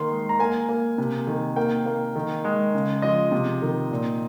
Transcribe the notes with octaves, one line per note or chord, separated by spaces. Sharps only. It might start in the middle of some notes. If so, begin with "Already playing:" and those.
Already playing: D#3 A#3 C6
G#3
A#5
A#3 G#5
A#3
C3
D#3
A#3 G5
A#3
D#3
G#3
C#3
F3 D#5
C3
D#3
A#2